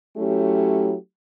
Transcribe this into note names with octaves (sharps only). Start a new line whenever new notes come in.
F#3 A3 C#4 E4 G4